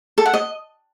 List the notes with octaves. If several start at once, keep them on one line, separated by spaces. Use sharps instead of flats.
A4
F#5
D#5